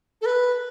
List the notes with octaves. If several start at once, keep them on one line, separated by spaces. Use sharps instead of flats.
A4
B4